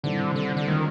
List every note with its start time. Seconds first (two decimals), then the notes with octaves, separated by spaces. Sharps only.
0.03 D3 D#3 G3 C4 E4
0.36 D3
0.57 D3
0.68 D#3 G#3 C#4 F4